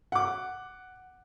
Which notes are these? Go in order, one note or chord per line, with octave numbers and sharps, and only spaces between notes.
F#5 D6